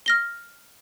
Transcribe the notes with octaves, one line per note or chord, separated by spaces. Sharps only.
F6 A#6 G7